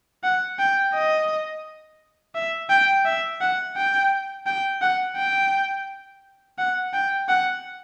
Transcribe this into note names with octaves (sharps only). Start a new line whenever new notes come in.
F#5
G5
D#5
E5
G5
E5
F#5
G5
G5
F#5
G5
F#5
G5
F#5